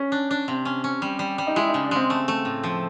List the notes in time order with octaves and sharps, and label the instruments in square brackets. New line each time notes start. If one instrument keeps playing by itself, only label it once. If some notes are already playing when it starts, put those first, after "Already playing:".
Already playing: [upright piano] C#4
[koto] D4
D4
[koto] C3 [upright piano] C4
[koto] C#4
C#4
G3
G3
G3
[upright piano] D#4
[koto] G#3 [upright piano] E4
[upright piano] D#4
[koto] C#3
[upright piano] D4
[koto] G#3 [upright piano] C4
[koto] A3
A3
A2
F3